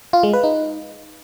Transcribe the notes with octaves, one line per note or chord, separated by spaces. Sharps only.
F4
G#3
B4
D#4